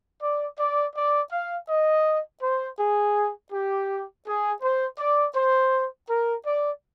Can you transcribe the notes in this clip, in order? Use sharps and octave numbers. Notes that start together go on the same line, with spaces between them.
D5
D5
D5
F5
D#5
C5
G#4
G4
G#4
C5
D5
C5
A#4
D5